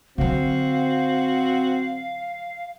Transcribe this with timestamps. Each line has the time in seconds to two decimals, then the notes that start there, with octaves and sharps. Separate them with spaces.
0.18 D3 F#3 C4 F#4 F5